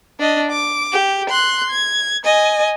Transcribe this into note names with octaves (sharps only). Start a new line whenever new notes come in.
D4 D#5
D6
G4
C6 F#6
G#6
D#5 G#5